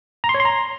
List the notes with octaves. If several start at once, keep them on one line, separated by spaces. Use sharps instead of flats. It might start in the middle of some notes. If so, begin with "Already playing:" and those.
A#5
C6
C#5
C6
A#5